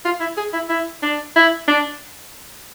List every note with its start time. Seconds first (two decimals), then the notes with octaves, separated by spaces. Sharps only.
0.05 F4
0.20 E4
0.37 G#4
0.53 E4
0.69 E4
1.03 D4
1.36 E4
1.68 D4